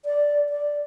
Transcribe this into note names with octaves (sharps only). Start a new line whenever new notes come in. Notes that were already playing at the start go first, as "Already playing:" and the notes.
D5
D5